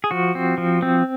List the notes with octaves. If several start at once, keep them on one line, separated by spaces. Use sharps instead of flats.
G#4
F3 F#4
C4
F3
C4